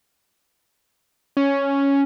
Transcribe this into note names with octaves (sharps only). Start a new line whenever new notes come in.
C#4